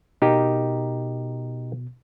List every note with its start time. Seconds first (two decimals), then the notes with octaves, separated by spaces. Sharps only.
0.22 B2 D#4 G4 A#4